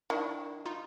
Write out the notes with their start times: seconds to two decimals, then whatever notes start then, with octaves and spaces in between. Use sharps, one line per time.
0.10 D#3 D4 E4
0.65 D#4 F4